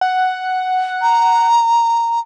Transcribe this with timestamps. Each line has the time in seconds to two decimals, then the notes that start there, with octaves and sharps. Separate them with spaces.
0.01 F#5
1.02 A#5